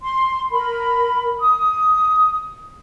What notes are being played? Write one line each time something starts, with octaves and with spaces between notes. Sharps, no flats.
C6
A#4 B5
D#6